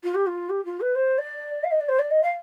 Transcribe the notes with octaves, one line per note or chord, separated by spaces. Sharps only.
F4
G4
F4
G4
F4
B4
C5
D5
F5
D#5
D5
C5
D5
D#5
F5